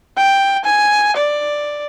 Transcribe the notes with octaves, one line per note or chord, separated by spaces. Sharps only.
G5
G#5
D5